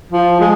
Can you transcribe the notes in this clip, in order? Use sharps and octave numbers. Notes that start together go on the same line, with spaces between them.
F3
G#3